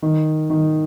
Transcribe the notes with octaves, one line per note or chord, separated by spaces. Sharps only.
D#3
D#3